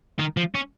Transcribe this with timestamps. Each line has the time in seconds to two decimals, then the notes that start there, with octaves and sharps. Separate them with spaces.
0.19 D#3
0.37 F3
0.55 C#4